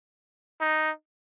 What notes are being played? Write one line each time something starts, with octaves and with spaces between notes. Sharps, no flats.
D#4